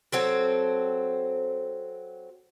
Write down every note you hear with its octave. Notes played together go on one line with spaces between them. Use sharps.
F#3 C4 A4